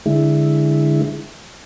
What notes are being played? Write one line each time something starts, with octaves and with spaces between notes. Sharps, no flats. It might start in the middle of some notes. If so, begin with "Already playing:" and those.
D3 G#3 E4